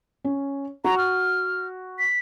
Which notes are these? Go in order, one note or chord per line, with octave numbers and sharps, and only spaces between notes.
C#4
F#4 A#5
F6
B6